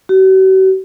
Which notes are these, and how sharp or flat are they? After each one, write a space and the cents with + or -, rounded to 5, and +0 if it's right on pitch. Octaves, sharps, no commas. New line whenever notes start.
F#4 +45